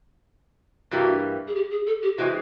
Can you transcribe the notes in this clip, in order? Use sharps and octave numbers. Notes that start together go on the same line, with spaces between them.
G2 E3 G3 A#3 F#4
G#4
G4
G#4
A4
G4
E3 G#3 C4 F4 F#4 G#4